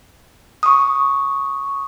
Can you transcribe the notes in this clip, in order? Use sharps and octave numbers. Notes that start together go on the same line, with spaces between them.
C#6 D#6